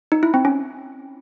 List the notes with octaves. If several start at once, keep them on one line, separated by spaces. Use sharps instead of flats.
D#4
E4
C4
C#4